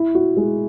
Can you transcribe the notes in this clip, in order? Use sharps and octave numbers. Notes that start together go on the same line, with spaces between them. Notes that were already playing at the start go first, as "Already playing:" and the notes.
Already playing: E4
F#4
G#3